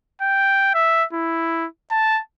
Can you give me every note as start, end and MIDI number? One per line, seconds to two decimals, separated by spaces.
0.21 0.71 79
0.74 1.05 76
1.13 1.67 64
1.91 2.21 81